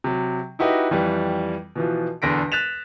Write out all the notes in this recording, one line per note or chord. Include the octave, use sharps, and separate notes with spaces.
C3 F#3
D#4 E4 F#4 G4 B4 D#5
F2 E3 G3
B2 E3 F3
E1 E2 D3 A#6 B6 D7
F#6 A6 B6 E7 F7